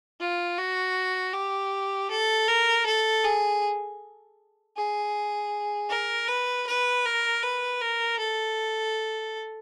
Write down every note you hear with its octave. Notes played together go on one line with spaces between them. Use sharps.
F4
F#4
G4
A4
A#4
A4
G#4
G#4
A#4
B4
B4
A#4
B4
A#4
A4